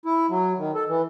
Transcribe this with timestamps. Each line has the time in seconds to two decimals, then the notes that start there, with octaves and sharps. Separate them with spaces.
0.05 E4
0.30 F#3
0.58 D#3
0.75 A4
0.89 E3